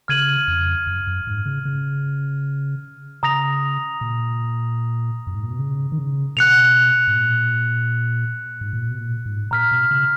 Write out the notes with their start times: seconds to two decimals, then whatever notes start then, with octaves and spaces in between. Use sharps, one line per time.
0.08 C#3 F6 G#6 D#7 F#7
0.48 F2
0.87 F#2
1.07 F#2
1.27 G#2
1.46 C#3
1.65 C#3
3.23 C#3 A#5 D#6 A#6 F7
4.01 A#2
5.27 F#2
5.35 G#2
5.43 A#2
5.50 B2
5.59 C#3
5.92 D#3
5.98 C#3
6.37 B2 F#6 C#7 F7
7.07 G#2
7.15 A#2
8.61 G#2
8.73 A#2
8.90 B2
8.98 A#2
9.26 G#2
9.51 A#2 A#5 F6 B6
9.71 B2
9.91 C#3